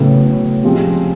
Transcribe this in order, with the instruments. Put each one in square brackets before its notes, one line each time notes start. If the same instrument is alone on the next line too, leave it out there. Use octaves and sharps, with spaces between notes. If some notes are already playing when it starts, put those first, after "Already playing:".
Already playing: [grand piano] A2 F#3 B3 E4 A4 [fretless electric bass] C#3
[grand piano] C3 F3 G#3 C4